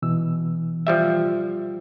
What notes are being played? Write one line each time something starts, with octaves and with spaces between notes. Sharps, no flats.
B2 E3 E6
F3 G3 E5